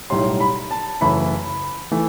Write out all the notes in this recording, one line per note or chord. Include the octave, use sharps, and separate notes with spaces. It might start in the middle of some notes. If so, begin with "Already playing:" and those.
B1 A2 G3 C6
B5
A5
F#1 F#2 E3 A3 B5
E3 A3